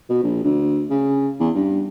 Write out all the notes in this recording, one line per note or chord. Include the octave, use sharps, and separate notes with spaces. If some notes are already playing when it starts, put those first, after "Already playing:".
B2
A#1
D2
C#3
E2
G2